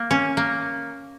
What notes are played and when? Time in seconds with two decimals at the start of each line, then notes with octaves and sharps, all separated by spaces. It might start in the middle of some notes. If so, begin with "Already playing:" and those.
Already playing: A#3
0.11 C#4
0.37 A#3